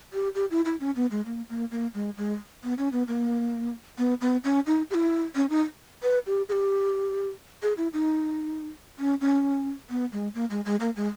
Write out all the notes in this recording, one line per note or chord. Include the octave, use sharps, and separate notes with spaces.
G4
G4
E4
E4
C#4
B3
G#3
A#3
A#3
A#3
G#3
G#3
B3
C#4
B3
A#3
B3
B3
C#4
D#4
G4
E4
C#4
D#4
B4
G4
G#4
G4
G#4
E4
D#4
C#4
C#4
B3
G#3
A#3
G#3
G#3
A#3
G#3